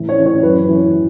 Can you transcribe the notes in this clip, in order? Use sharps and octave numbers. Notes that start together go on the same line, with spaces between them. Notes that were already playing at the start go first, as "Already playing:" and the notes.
Already playing: A2 E3
C#5
E3
C#5
F#2 B4
E3